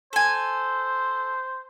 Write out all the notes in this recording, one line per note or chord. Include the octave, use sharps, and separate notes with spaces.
A4 C5 G#5